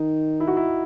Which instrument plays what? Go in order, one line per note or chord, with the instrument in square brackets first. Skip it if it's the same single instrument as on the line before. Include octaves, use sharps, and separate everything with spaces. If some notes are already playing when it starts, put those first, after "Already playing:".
Already playing: [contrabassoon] D#3 [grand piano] D#4
[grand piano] E4
F#4
E4